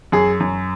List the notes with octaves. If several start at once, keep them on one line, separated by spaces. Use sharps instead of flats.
F#2 G#4
F#2